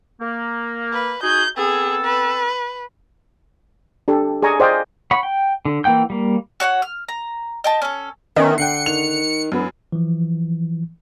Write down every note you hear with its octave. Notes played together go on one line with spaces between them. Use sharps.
A#3
B4
D#4 F#4 G#4 G6
B3 C4 G#4 A4
B4
D4 G4 A4
G#4 D5 G#5 A#5 C#6
G#4 C5 D5 D#5 F5 G5
C#5 F#5 B5
G5
D3
E3 A#3 F#5 G5 G6
G3 A#3
F#4 C#5 D5 F#5
F6
A#5
D#5 G5 A5
C#4 A4
D#3 B3 C#4 A#4 E5
D3 G5 F#6 C7 C#7
D#3 F7
E1 F#2 B3
E3 F3